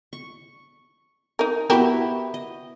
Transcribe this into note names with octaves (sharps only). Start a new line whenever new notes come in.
C#6
D#4 A#4
B3 E4 F#4 G4 A#4 E5
D#5